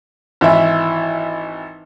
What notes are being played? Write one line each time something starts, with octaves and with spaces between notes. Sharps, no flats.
G#1 E3 E4 E5